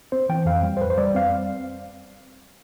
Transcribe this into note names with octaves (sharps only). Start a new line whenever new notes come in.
C4 C5
E3 G5
F2 F5
G3
C5
F2 B4
C5
G3 D5
C4 F5